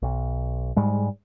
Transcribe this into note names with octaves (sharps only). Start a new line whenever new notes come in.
B1
G#2 G3 G#3